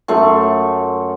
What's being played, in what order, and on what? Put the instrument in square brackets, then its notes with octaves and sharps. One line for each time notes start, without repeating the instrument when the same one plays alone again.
[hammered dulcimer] F#2 A3 C6 C#6